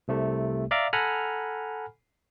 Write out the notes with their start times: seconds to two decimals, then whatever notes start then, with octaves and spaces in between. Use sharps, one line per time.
0.08 C2 C3 A3
0.71 D5 E5 F5 A#5 D6
0.93 A4 F#5 G#5 A#5 B5 F6